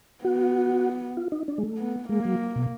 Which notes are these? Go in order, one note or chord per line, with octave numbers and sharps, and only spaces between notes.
B3 F#4
F4
D#4
D4
G#3
A3
B3
G#3 A#3
F#3
B2